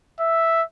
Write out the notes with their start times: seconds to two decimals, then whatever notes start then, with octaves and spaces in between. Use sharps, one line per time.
0.20 E5